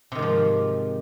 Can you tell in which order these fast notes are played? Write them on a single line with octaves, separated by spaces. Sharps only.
C3 D#3 G#2 F3